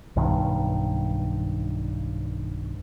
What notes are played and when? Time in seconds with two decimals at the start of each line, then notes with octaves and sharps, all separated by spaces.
0.16 B1 G2 D#3